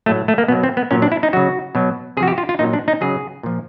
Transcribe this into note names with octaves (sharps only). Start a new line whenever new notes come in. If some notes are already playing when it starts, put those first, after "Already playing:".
A2 F#3 A3
A3
A#3
B2 F#3 B3
C4
B3
A#2 F#3 C#4
D4
E4
D#4
C#3 F#3 F#4
B2 F#3
C3 F3 F#4 G#4
G4
F4
F4
A#2 F#3 D#4
D4
D#4
C#3 F#3 G#4
A#2 F3